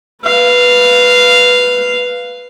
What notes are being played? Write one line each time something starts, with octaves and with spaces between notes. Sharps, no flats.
B4 F5